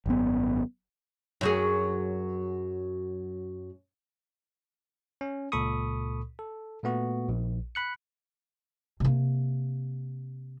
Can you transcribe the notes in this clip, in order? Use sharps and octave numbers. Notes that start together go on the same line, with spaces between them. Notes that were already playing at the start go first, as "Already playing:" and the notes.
G#1 F#2 B3
F#2 F#3 G#4
C#4
C#2 A#2 A4 B5 C#6 D#6
A4
A#2 A3 B3 F#4
A#1
B5 F#6 C#7
C3 A#3